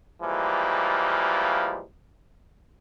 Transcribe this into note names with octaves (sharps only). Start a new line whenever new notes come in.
E3 F3 G3 G#3 A#3